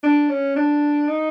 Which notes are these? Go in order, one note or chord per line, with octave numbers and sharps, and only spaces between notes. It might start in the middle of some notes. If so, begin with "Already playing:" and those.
D4
C#4
D4
D#4